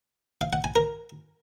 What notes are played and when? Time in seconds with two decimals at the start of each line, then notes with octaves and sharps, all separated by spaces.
0.41 F5
0.53 F#5
0.64 G#5
0.76 A#4